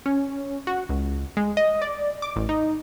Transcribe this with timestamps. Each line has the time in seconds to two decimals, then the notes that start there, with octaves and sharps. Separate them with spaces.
0.06 C#4
0.67 F#4
0.89 C#2
1.37 G#3
1.57 D#5
1.82 D5
2.22 D6
2.36 A1
2.49 D#4